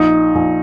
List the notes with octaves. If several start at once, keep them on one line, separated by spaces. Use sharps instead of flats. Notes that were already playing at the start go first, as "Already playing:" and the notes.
Already playing: A#1 D#4
A#1